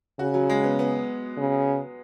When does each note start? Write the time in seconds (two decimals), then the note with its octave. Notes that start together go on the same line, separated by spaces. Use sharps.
0.19 C#3 F#4
0.34 F#3
0.49 G#3
0.64 B3
0.79 B3
1.38 C#3